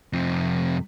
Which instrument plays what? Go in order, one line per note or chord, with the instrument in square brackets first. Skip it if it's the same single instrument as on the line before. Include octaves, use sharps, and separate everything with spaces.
[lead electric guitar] F2 C3